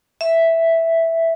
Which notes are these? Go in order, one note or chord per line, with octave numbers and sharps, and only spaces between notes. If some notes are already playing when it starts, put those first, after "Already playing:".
E5